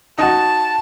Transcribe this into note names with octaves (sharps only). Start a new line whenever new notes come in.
D#4 F#4 A5